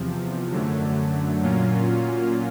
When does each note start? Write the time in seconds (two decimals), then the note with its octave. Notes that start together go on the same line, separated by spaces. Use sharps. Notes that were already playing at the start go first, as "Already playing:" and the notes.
Already playing: E2 C3 F3
0.51 F#2 D3 F#3 A3
1.42 A#2 F#3 A#3 C#4 F4